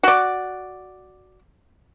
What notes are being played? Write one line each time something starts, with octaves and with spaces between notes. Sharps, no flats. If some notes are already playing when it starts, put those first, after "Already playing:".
F#4 D5